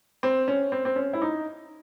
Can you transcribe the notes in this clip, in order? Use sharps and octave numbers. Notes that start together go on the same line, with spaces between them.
C4
C#4
C4
C4
C#4
E4
D#4